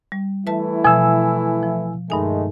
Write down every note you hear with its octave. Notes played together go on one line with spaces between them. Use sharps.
G3
E3 A3 E4 B4 E5 A5
B2 F3 G#5 E6
F3
G2 D#3 G#3 A3 D#4 G#5